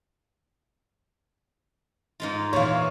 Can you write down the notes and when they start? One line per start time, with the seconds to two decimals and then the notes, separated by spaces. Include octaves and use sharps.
2.20 G#2 G#3 F4
2.53 A#2 E3 C#5 F5